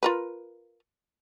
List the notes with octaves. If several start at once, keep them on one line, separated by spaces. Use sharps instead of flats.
F4 A#4 B4